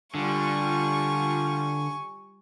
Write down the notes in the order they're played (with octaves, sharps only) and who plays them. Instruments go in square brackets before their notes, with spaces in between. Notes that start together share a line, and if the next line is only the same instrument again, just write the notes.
[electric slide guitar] D3 [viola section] G3 F4 [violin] G#5 C#6